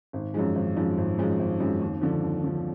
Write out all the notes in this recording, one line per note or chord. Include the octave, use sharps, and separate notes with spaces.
G#1
F#2 F3 G#3
G#1
F#2 F3 G#3
G#1
F#2 F3 G#3
G#1
F#2 F3 G#3
D#2
D3 F3
D#2
D3 F3